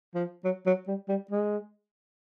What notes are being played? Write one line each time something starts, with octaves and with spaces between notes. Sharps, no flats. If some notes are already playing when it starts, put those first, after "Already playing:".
F3
F#3
F#3
G3
G3
G#3